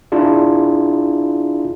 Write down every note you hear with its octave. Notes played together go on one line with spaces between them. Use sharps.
D4 E4 F4 G#4